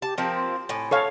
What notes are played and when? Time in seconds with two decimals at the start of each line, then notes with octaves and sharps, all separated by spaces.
0.02 G4 A5
0.18 F3 A#3 C4 A5
0.35 C6
0.69 A2 G#5
0.91 A4 C#5 F5